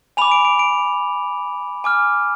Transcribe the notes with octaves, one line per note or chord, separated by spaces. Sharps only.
G#5 B5 D6 F7
D7
D7
D7
G#5 D6 F6